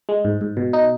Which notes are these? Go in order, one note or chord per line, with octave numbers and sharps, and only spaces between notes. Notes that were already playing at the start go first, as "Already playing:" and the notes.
G#3
G#2
G#2
B2
D#4